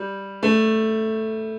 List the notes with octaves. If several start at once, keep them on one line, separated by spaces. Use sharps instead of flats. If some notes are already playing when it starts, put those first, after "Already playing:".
Already playing: G3
A3